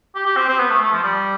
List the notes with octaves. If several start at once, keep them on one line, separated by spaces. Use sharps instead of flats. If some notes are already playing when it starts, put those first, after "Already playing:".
G4
G4
C4
C4
B3
A3
A3
F3
G3